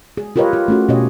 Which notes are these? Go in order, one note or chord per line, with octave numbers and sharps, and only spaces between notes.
G#4
F4 G4 A#4 B4 C#5 D#5
F4
A3 C#4 F#4
B2 C#4 G4 C#5 D#5